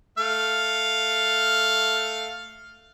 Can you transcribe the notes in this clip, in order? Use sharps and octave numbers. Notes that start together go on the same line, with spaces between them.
A3 F5